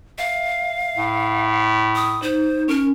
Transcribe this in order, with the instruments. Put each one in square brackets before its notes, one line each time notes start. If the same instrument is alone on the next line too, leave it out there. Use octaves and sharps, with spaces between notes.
[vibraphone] E5 [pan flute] F5
[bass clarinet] A2
[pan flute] D#6
[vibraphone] D#4 [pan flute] C5
[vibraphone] C#4 [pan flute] A#4